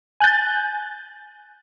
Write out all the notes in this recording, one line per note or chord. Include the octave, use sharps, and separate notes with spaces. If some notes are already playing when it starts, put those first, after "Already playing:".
G#5 F#6 G6 A6